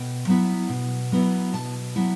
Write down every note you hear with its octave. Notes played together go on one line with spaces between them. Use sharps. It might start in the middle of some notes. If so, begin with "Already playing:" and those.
Already playing: B2 G5
F#3 B3 E4
B2
F#3 B3 E4
B2 A5
F#3 B3 E4